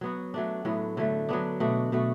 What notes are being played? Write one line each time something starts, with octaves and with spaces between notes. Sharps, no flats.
F#3 B3 F#4
F#3 A3 D4
A2 F#3 B3
D3 F#3 A3
F#3 B3 D4
B2 A3 D4 F#4
B2 A3 F#4